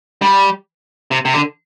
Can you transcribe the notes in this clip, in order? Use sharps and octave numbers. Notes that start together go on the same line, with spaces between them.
G3
C3
C3
D3